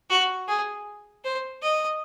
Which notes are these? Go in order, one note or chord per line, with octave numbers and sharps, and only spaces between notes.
F#4
G#4
C5
D#5